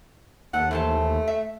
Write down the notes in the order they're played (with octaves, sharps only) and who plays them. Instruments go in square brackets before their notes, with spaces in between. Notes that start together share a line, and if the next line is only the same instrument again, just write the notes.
[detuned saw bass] D#2 [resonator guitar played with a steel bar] A3 [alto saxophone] F#5
[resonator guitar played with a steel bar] E3 C5 A5 [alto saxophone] A3
[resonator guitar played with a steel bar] E5